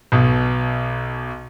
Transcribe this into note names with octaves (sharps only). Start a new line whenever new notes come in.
B1 B2